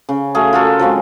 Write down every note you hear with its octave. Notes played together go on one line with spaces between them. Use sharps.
C#3
A3 F#4 G#4 F5
F4 F#4 A4 A#4
F3 F#3 G#3 C4